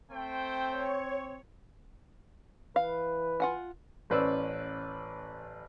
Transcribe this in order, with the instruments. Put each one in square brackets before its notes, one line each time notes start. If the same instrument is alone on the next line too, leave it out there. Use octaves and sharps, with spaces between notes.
[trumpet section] A3 C5 G5 [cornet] C4
[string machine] C#5
[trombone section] E3 B4 [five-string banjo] F5
[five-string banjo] F4 F#5 G#5
[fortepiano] A1 C#4 B4 C5 D5 E6